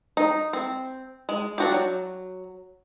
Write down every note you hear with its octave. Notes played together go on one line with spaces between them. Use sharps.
D#4
C4
G#3
D4 F#4 G4
F#3